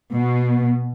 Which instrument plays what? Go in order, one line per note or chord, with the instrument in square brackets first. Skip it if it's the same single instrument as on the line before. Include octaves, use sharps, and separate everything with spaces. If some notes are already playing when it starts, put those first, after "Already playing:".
[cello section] B2